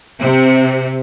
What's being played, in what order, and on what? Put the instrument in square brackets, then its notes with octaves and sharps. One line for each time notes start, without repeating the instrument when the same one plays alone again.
[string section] C3